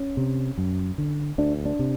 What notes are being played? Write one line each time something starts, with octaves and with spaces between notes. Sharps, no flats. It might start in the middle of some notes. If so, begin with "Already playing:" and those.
Already playing: C#4
C3
F#2
D3
D2 D4
D4
C3